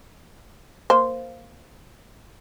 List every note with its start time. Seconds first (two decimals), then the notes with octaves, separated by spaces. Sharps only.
0.90 A#3 C5